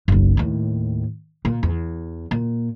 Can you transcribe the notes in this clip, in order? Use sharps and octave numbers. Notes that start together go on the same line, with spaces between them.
F#1 B1
D#2 A2
A#2
E2
A#2